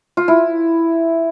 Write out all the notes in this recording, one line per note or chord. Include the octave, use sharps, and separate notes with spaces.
F4
E4